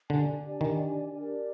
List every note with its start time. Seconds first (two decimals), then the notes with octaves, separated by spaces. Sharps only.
0.09 D3 D4 G4 D5 G#5
0.61 D#3
1.12 D4 G4 A#4 D5